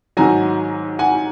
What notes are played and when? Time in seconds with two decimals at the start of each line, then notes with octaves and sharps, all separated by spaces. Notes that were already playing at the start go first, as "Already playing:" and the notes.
0.17 G#2 D#3 F#3 G#5 A#5
0.99 F#5 G#5